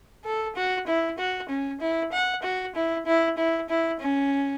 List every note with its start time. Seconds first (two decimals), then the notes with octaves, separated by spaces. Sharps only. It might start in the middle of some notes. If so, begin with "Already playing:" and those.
0.25 A4
0.56 F#4
0.87 E4
1.18 F#4
1.49 C#4
1.81 E4
2.12 F#5
2.43 F#4
2.75 E4
3.06 E4
3.38 E4
3.69 E4
4.00 C#4